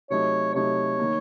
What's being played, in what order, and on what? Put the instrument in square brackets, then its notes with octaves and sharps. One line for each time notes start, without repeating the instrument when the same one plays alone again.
[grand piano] C3 F#3 A3 D#4 [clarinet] C#5
[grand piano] C3 F#3 A3 D#4 [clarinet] C#5
[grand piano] D#3 A#3